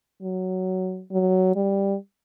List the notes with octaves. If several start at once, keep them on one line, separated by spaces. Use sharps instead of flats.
F#3
F#3
G3